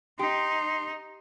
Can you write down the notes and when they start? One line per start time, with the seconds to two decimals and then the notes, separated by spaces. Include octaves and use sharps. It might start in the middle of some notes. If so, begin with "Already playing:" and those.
0.19 D#4 G4 C6